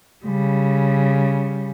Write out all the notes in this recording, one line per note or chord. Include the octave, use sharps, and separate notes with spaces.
C#3 G3